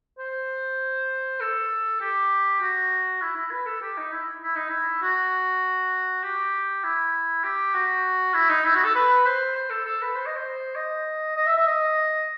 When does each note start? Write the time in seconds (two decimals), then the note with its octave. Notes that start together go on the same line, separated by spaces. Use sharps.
0.19 C5
1.40 A4
2.00 G4
2.61 F#4
3.22 E4
3.36 E4
3.51 B4
3.66 A4
3.81 G4
3.97 D#4
4.12 E4
4.42 E4
4.56 D#4
4.69 E4
5.02 F#4
6.23 G4
6.84 E4
7.44 G4
7.74 F#4
8.34 E4
8.49 D#4
8.64 E4
8.75 F#4
8.84 A4
8.95 B4
9.25 C5
9.55 C5
9.70 A4
9.85 A4
10.01 B4
10.15 C5
10.26 D#5
10.36 C5
10.76 D#5
11.36 D#5
11.46 E5
11.57 E5
11.66 D#5